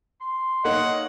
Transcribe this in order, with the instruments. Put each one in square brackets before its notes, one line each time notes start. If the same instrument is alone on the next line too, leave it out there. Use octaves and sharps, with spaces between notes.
[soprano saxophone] C6
[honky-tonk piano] A#3 D#4 C#5 [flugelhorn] D#5 [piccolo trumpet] F#5